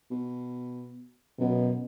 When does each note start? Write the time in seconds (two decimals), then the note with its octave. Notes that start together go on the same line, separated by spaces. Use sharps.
0.11 B2
1.39 F#2 B2